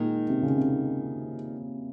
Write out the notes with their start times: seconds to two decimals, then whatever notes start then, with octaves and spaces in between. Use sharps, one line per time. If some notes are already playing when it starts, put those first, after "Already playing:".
Already playing: A#2 D#3 G#3 D#4
0.29 C3
0.42 C#3
0.56 C3